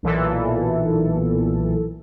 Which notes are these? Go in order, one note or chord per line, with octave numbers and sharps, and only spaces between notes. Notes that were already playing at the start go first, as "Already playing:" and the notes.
B1 A#2 E3 A4